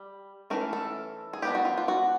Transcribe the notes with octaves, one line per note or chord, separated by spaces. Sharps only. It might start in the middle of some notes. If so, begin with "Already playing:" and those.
Already playing: G3
E3 A3 C#4 A#4
A4
G#4
F#3 B3 D4 G4
F#4
F4
F4
F#4